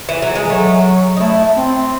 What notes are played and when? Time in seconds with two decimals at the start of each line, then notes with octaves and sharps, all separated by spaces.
0.09 E3
0.22 F#3
0.36 G#3
0.46 E3
0.50 F#3 A3
1.17 D#4
1.20 A3 E4
1.57 C4